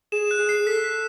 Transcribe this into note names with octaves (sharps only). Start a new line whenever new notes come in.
G#4 E7
F#6
G#4
C7
G#4
A4 B6
B6